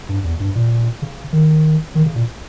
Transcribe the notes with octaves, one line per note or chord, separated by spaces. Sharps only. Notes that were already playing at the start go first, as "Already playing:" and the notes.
G2
E2
G2
A#2
C#3
D#3
D#3
C#3
A#2